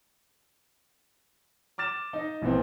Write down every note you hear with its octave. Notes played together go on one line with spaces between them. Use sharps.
D6 F6 A6 E7
D#4 D#5
A#1 A#2 E3 B3 C4